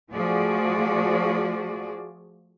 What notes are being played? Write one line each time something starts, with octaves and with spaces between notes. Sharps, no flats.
F3 A3 F#4 G#4 D5